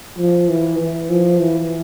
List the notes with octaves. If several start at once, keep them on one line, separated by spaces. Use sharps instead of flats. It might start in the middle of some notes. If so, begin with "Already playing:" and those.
F3
E3
E3
F3
E3